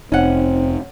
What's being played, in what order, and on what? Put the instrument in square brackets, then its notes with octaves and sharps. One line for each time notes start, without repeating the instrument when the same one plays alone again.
[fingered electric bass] F1 [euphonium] C4 [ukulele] C#4 F#5 [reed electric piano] D#4